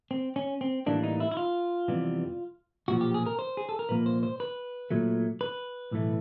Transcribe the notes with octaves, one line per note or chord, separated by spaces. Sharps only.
C4
C#4
C4
A2 E3 G3 A#3 D4
D#4
E4
E4
F4
F2 C3 E3 G3 B3
B1 A#2 F3 F#4
G4
G#4
A#4
C5
G#4
A4
A#4
C2 A#2 F3 A#3 B4
C5
C5
B4
A#2 F#3 A3
B4
B1 A2 E3 A3